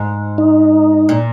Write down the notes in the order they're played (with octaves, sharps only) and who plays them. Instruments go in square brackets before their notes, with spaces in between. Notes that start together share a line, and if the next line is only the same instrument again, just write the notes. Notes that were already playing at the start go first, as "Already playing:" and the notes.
Already playing: [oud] G#2
[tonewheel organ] D#4
[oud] A#2